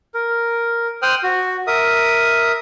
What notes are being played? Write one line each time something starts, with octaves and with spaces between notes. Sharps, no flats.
A#4
C5 G5 D#6 F6 F#6
F#4
A#4 E5 D#6